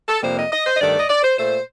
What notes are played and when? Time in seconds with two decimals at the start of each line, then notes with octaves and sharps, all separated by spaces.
0.09 A4
0.23 F2 C3 G3 A#3 C5
0.38 D#5
0.52 D#5
0.66 C5
0.75 D#5
0.81 G2 D#3 A3 D5
0.99 D#5
1.10 D5
1.23 C5
1.38 A#2 A3 C5